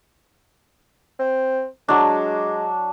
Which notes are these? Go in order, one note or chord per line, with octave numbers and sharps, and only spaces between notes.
C4
F#3 G#3 D4